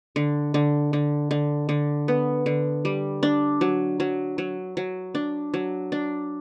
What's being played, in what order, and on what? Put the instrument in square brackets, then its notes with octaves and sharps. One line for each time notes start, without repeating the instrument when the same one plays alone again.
[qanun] D3
D3
D3
D3
D3
B3
D3
G3
D4
F#3
F#3
F#3
F#3
D4
F#3
D4